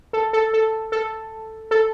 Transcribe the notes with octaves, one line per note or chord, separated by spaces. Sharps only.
A4
A4
A4
A4
A4